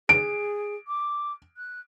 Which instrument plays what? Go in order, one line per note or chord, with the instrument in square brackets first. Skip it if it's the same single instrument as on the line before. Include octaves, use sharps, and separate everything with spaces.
[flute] G#4 [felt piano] D7
[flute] D6
F#6